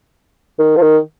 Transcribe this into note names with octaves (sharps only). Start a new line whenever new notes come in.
D#3
F3
D#3